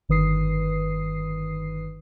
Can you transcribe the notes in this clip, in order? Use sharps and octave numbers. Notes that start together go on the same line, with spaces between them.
G1 D#3 B4 D#6 C7